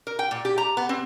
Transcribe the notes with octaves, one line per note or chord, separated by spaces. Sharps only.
A#4
G5
A#2
G4
A#5
B3
C4